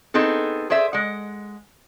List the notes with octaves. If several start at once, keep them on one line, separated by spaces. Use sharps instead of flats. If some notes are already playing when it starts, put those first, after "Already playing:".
B3 C4 D#4 G#4 A4
G#4 C5 D5 E5
G#3 F#5